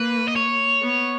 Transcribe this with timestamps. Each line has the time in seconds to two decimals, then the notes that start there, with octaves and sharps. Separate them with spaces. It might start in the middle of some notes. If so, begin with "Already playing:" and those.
Already playing: A#3 B4
0.28 D#5
0.36 C#5
0.82 B3